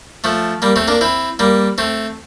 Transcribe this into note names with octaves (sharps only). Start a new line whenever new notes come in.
F3 A3
G3 A#3
A3 C4
A#3 D4
C4 E4
G3 A#3
A3 C4